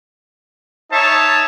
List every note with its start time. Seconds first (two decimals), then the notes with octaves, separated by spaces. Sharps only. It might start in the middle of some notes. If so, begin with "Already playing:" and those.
0.92 D#4 C#5 E5 A5